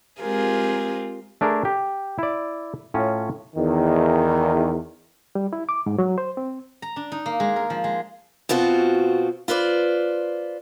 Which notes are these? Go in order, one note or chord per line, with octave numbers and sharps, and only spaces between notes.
G#3 C4 F4 G4 G#4 A#4
A3 D4 G#4 A#4
G4
E4 D5
A2 C#4 F4
E2 D#3
G3
E4
D6
G#2
F#3
C5
C4
A#5
D4
D#4
A#3
G#3
A#4
F3
G#3
B2 C4 F4 F#4
F4 B4 C5 D5